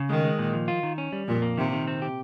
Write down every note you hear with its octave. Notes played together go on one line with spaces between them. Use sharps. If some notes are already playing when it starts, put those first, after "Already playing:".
Already playing: C#3
D#3 G#3
G#3
A#2
F3
F4
D#3
C#4
G3
F2 A#2
A#3
C3 D#3
D#3
C4
G4